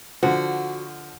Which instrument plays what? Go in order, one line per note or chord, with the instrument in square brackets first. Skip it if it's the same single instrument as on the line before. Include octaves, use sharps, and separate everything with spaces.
[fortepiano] D3 F3 [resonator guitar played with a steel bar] F#4